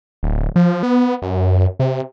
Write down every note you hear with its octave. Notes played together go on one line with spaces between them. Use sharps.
D1
F3
B3
F#2
C3